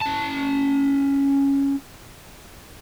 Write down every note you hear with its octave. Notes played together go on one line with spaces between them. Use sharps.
C#4 A5